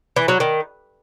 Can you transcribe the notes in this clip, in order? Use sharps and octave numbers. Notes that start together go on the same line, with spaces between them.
E3
F#3
D#3